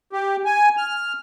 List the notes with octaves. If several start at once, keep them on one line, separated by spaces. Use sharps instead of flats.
G4
G#5
F6